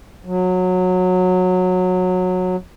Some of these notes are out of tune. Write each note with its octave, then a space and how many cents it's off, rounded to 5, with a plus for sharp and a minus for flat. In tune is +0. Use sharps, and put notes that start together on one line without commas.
F#3 -15